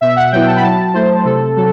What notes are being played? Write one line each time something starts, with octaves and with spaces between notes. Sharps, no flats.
B2 E5
F#5
F#3 B3 E4 G5
A5
B5
F#3 A5
A3 E4 C5
C3 A4
F#3 A4